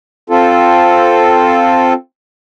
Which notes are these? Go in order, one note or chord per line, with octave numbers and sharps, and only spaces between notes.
C4 F4 A4